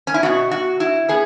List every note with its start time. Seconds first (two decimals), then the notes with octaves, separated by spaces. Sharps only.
0.07 C#4
0.14 E4
0.22 B2 B3 F#4
0.51 F#4
0.80 E4
1.08 B3 G#4